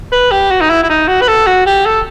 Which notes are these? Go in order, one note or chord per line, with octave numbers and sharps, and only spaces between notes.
B4
G4
F#4
D#4
E4
E4
D#4
F#4
B4
A4
F#4
G4
A4